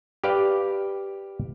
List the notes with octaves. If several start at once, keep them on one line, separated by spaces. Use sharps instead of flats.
G4 B4 D5 F5 G5